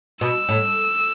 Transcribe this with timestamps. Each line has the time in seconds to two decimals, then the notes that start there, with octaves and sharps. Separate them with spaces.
0.21 B2 E6
0.49 A2